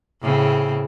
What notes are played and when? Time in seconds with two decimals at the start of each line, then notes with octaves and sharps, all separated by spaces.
0.22 A2 C#3 C4